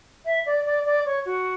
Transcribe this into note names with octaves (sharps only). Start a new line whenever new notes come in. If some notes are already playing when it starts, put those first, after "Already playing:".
E5
D5
D5
D5
C#5
F#4